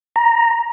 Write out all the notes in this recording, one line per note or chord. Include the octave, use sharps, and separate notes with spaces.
A#5